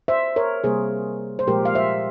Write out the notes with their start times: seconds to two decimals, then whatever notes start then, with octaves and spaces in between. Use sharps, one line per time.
0.08 C5 E5
0.36 A#4 C#5
0.64 C3 G3 A#3 G#4 C5
1.39 C5
1.47 A#2 F3 G#3 G4 A#4
1.65 F5
1.75 C5 E5